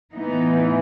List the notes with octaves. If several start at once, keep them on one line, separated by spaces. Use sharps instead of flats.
A2 E3 B3 D#4